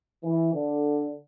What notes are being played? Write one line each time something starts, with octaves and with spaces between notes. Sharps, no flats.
E3
D3